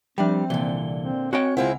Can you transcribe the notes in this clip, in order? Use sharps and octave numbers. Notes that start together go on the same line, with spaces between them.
F3 G3 C4 D4 E5 G5
C2 A#2 D3 E3 G7
C4
C4 F#4 C#5 D#5 G5 G#5
C#2 G#3 C4 E4 F4 F#5